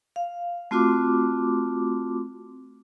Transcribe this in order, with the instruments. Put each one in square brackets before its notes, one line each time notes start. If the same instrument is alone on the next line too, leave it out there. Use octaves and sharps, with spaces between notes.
[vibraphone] F5
A3 C4 F4 F#4 C6 D6